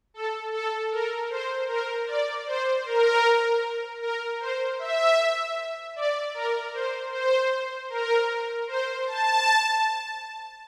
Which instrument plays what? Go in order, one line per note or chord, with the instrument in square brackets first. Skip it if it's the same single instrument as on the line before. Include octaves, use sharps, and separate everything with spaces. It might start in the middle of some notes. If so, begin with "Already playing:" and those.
[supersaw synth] A4
A4
A#4
C5
A#4
D5
C5
A#4
A#4
C5
E5
D5
A#4
C5
C5
A#4
C5
A5